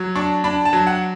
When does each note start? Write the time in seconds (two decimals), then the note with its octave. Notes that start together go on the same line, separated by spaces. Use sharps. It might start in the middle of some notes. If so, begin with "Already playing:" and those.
Already playing: F#3
0.15 D4 C#6
0.44 D4 B5
0.65 A5
0.73 F#3
0.87 F#5